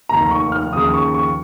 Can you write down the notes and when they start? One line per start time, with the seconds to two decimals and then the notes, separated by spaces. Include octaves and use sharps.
0.09 F1 D#2 D#3 A#5
0.31 C#6
0.52 F6
0.73 D#2 C#3 F3 D#6
0.94 C#6
1.15 C#6